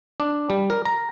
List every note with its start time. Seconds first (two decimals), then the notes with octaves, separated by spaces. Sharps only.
0.20 D4
0.50 G3
0.70 A#4
0.85 A#5